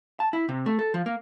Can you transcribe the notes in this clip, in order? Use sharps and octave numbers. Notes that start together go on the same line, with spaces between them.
A5
E4
C3
A3
A4
F3
A#3